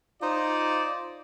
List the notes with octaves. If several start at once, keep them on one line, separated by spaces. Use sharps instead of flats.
D#4 F4 C5 D5